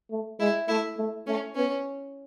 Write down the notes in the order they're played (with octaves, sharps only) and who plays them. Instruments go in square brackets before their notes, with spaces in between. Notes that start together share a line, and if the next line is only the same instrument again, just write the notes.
[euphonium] A3
[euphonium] G#3 [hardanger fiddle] E4
[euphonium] A3 [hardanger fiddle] E4
[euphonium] A3
[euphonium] A3 [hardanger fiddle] C#4
[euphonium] B3 [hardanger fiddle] C#4